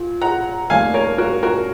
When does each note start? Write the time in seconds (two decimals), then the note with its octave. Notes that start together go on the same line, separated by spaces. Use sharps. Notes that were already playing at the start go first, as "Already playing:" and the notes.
Already playing: A#2
0.22 F#5 A#5
0.70 F1 D#2 D#3 A#3 F5 G#5
0.94 A#4 C#5
1.18 F#4 A#4
1.43 F#4 A#4